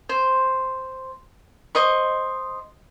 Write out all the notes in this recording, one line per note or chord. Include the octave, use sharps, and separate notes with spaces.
C5
C5 D#5 C#6